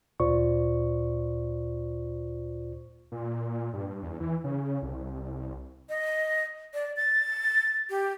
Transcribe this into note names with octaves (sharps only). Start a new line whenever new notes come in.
D2 A#2 F4 C5 D5 C#6
A#2
G2
E2
E3
C#3
C2
D#5
D5
A6
G4